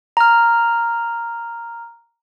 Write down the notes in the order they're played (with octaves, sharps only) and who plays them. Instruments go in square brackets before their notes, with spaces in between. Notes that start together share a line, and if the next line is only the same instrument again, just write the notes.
[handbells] A#5 F6